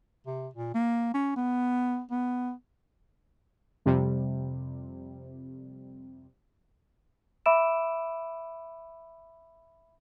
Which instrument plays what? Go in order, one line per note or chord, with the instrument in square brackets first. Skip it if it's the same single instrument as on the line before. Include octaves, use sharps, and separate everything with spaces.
[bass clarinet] C3
A#2
A#3
C#4
B3
B3
[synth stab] F2 C3 G3
[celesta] E5 B5 D6 E6 D7 E7